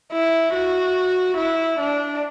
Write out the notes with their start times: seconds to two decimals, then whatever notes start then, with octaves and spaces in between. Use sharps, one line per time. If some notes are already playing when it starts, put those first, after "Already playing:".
0.12 E4
0.54 F#4
1.37 E4
1.79 D4